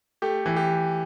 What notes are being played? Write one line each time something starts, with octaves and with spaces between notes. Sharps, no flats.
A3 G4
E3
G4